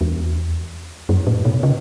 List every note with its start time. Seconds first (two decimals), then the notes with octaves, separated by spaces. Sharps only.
0.01 E2
1.09 F#2
1.27 A2
1.45 B2
1.63 C#3